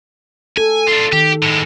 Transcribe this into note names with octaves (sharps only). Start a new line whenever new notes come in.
A4 G#5
D4 F4
D#3 G4
A2 G#3